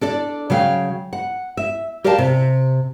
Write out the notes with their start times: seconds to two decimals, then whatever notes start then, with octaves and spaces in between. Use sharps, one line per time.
0.01 D4 A4 D5
0.50 C#3 F#3 F5 G5
1.13 F#5
1.57 E5
2.04 G4 A#4 D5 F5 G5 A5
2.18 C3